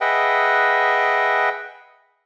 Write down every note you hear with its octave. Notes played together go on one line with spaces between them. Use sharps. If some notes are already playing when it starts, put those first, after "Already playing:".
G#4 B4 D#5 E5 F#5 G5